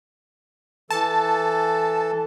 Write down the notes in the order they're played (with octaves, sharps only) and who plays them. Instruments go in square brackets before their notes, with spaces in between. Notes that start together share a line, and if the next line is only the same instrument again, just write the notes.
[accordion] E3 A4 [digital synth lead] A5